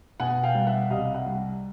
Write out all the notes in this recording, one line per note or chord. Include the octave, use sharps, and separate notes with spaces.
B2 F#5 G#5
F5 G5
G3
E5 F#5
C2 D#5 F5
E5 F#5
G3